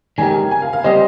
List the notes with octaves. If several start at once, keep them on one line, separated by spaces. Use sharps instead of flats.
D#3 G#3 C#4 G4 A#4 G#5
G#5
F5
F5
G3 C4 G4 C5 D#5